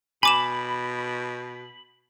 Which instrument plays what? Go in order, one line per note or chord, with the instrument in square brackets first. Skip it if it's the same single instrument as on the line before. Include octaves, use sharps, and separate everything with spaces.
[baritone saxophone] B2 [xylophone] G#5 D6 E7 [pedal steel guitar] B5